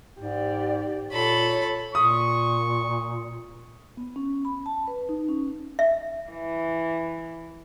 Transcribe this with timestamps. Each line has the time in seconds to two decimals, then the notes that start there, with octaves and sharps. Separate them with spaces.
0.20 G#2 G4 D5
1.13 A#2 A4 C#5 B5
1.95 A#2 C#6 D#6
3.97 B3
4.16 C#4
4.45 B5
4.66 A5
4.88 B4
5.09 D#4
5.29 C#4
5.79 E5
6.31 E3